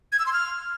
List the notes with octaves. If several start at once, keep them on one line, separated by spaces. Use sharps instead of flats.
G#6
E6
C6
F6